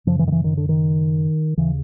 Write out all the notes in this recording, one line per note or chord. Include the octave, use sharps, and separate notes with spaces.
F#2 C#3 F3
E3
D#3
E3
D#3
D3
D#3
D#2 C#3 E3